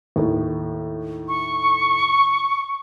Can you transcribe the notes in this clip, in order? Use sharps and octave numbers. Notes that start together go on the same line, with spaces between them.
D#2 A2
C#6